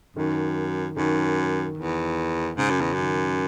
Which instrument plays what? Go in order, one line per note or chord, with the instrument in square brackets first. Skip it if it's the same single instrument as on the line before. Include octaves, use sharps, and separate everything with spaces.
[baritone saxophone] F#2 [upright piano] D#3
[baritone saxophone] F#2 [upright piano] D#3
[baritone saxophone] E2
[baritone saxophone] G#2 [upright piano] C#3
[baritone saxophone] F#2
E2
[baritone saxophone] F#2 [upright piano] D#3